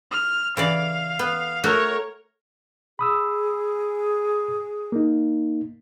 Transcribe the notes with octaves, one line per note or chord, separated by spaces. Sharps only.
F6
C#3 E3 D5 F5
B3
A3 F#4 A#4 C#5
G#4 B5 D#6 E6
A#3 D#4